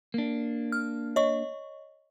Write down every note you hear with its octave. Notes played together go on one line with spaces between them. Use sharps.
A#3 D4
F6
C#5 D#5 C#6